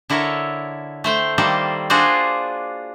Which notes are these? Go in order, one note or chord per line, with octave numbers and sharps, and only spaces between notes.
D3 E4 A4 A#4 C#5
A3 C5 G5
D#3 G3 A#3 A4 C5
D4 F4 F#4 G#4 C5 D5